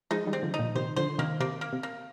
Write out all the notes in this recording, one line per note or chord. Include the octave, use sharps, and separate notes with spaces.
F3 G#3 D#4
D#3 G3
C4
D3 F3
D#4
A#2
C3 D#3 C5
D3 F3 C5
C3 D#3 A#3
C3 A#3
A#3
C3
A#3